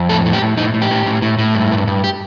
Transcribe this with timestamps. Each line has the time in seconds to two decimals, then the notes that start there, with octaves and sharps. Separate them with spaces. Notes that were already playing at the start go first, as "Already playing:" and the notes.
Already playing: F2
0.09 A2 A4
0.26 A2
0.33 G4
0.42 A2
0.57 A2 D#4
0.74 A2
0.82 G4
0.91 A2
1.06 A2
1.22 A2
1.39 A2
1.55 G2
1.72 G2
1.87 G2
2.04 G4